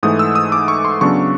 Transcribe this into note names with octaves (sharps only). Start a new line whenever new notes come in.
G#2 E3 A3 D#6
E6
D#6
D6
C#6
C6
C#3 F#3 B3 D4 C#6